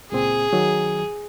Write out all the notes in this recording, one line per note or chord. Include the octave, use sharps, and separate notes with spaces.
C#2 A#2 C4 G#4
D#3 F#3